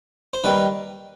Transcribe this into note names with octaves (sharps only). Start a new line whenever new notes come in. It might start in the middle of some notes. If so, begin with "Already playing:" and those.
C5
D#2 D#3 G3 B4